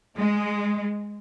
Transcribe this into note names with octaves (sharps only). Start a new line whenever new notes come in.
G#3